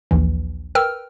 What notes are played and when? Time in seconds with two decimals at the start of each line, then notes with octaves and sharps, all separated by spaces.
0.11 A#1 D#2 E3
0.75 A#4 B4 G5 E6 F6